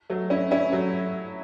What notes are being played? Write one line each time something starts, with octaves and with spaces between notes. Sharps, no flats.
F#3 A3
C#4 E4
C#4 E4
F#3 A3